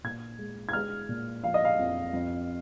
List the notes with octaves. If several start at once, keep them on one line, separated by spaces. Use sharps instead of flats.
A#2 G#6
G#3
G#6
G#3 F6
A#2
F3 F5
D#5
F5
F2
F2